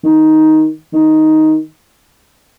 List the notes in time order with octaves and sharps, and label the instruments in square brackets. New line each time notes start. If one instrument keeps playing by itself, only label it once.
[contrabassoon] D#3
D#3